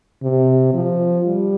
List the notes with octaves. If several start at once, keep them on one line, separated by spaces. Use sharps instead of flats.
C3
F3
G3